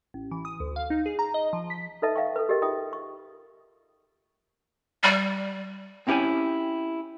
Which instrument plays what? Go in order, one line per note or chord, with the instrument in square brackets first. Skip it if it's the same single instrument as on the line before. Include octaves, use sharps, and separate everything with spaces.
[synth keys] A1
E3
D#6
D2
F5
D#4
G#4
A#5
D#5
F3
B6
[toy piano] D#4 A4 B4 D#5 E5 A5
E5 F5 G5 C#6
A4 B4
G4 G#4 A#4 D#5 G5
D#4 F4 E5 G5 D#6
C#6
[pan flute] G3
[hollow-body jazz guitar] C4 C#4 E4 G4 C#5 G#5